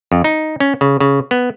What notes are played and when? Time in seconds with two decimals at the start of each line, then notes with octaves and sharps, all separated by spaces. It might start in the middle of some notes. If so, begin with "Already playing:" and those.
0.12 F2
0.24 D#4
0.60 C#4
0.81 C#3
1.00 C#3
1.31 B3